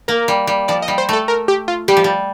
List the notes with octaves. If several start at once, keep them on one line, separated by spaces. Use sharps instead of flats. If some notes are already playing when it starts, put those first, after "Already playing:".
A#3 A#4
G3
G3
F3 D5
D#5
G3
C5
A3 A4
A#4
G4
F4
G3 G4
F3
G3